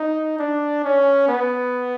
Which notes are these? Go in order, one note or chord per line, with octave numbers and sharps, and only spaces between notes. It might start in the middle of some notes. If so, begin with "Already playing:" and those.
Already playing: D#4
D4
C#4
B3